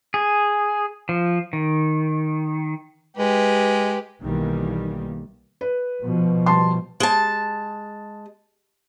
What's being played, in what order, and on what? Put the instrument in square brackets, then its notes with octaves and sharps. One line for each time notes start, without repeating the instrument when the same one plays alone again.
[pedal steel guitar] G#4
F3
D#3
[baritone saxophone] G#3 [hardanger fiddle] G4 B4
[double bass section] B1 D#3 E3 G3 A#3
[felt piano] B4
[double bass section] B2 F3
[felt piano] G3 A5 C6
[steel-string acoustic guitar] G#3 A5